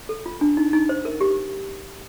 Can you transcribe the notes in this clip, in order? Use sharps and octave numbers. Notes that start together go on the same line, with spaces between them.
A4
F4
D4
D#4
D#4
C5
A#4
G4